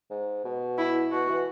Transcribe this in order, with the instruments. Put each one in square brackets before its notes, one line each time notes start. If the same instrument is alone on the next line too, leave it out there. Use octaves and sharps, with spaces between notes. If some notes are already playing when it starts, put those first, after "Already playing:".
[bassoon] G#2
B2
[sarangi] E4
[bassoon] B2 [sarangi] F#4
[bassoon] E3